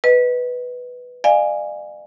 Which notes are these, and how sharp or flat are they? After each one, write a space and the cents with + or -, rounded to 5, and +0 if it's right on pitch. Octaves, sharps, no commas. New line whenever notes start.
B4 +0 D#5 +0
D5 +40 F5 -15 G#5 +0